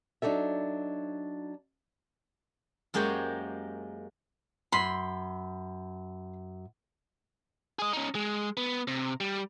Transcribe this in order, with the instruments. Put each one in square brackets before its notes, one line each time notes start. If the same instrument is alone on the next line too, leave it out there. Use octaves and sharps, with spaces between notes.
[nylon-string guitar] F#3 D4 D#4 A4 E5
[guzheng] F#2 G#3 A#3 G4 C5 C#5
[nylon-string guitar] F#2 [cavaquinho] B5 C6
[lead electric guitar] G#4 D#5
C#4 D#4
G#3
B3
C3
G3